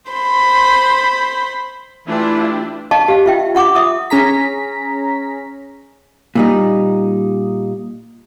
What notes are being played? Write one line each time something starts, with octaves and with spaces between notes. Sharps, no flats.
C5 B5 C6
E3 A3 D4 E4 F4 G4
D#5 F5 A5 C#6
G4 F5
F4 E5 G5
F4 F#5 C#6 D6
E5 D#6
C#4 G#4 A#5 B6
A#2 G3 D#4